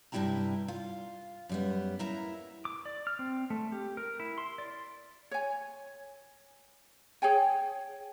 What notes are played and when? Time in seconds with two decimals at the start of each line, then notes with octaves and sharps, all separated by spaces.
0.12 G2 C3 G3 E4 G5 A#5
0.68 F4
1.49 F#2 G3 B3
1.99 A#3 E4 A#5
2.65 D6
2.86 D5
3.07 F6
3.19 C4
3.50 A3
3.72 G4
3.97 A#4
4.20 E4
4.38 C6
4.58 D5
5.31 C#5 G#5
7.22 G#4 C#5 G5 G#5